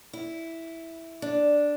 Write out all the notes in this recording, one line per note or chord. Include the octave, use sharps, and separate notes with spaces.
E4
D4